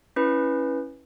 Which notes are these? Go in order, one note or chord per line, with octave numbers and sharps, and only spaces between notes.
C#4 E4 B4